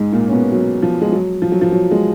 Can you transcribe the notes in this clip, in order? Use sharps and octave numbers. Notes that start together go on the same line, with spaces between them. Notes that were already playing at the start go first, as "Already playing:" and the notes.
Already playing: G#2 G#3
A#2 A#3
C#4
B2 B3
F#3
F3
G#3
F#3
F3
F#3
F3
F#3
G#3